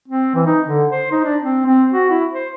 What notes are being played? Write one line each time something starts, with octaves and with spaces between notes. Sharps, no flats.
C4
E3
D#4
D3
C5
D#4
D4
C4
C4
F#4
E4
C5